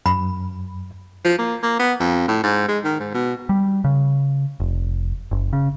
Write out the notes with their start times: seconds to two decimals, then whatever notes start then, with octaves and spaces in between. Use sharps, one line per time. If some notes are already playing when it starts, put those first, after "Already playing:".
0.06 F#2 B5
1.25 F3
1.38 A#3
1.63 A#3
1.80 B3
2.00 F2
2.28 A2
2.44 G#2
2.69 G#3
2.84 D#3
3.00 G#2
3.14 B2
3.49 G3
3.84 C#3
4.60 F1
5.31 F#1
5.53 C#3